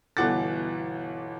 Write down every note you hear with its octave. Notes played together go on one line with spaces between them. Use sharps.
G1 B2 E3 F#5 D6 A6